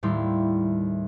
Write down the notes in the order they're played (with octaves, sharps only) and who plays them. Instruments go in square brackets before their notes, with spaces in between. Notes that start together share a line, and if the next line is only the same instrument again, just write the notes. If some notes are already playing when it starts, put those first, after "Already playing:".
[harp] D#2 A2 G3 E4 B5 C6